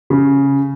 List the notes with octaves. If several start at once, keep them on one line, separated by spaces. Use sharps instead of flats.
C#3